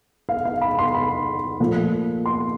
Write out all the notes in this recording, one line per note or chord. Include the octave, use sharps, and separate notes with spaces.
F5
F5
B5
C6
B5
A#2 F3 A3
C6